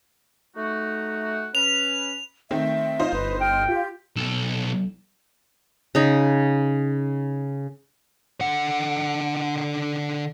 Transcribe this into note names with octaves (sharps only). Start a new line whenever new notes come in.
A3 D#4 F#4
C#4 B4 F7
D#3 A3 C4 E5
D#4 F4 C5 G6
G1 B4
G5 F6
F4 G4
B1 A4
C#3 D#4
D3 F#5